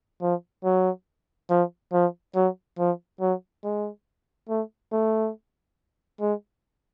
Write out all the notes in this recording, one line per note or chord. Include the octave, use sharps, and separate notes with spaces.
F3
F#3
F3
F3
F#3
F3
F#3
G#3
A3
A3
G#3